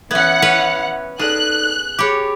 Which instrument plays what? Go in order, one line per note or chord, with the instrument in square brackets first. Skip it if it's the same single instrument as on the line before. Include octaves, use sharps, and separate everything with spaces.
[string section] E3 F#5 [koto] B3 C#4 [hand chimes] E5 F#6 G#6
[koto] C#4 B4 C#5
[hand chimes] D#4 A4 D5 [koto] G#4 [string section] F#6
[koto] G4 C#5 [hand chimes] G#4 B5 D6